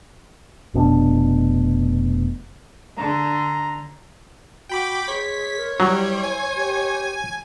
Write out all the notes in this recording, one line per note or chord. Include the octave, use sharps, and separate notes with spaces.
F1 B2 C#4 D4
D3 A#5
F#4 G5 B5 D6
G#4 C#5 B6
A#4
F#3 G3 E4
G#5
G4